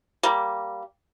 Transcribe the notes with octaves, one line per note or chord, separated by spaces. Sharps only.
G3 A#3